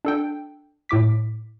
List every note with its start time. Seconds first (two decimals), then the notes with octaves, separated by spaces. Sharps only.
0.05 D4 A4 G5
0.89 A2 E4 D6 B6